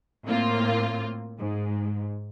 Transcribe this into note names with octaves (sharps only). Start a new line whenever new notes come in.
A2 A#3 C4 F4
G#2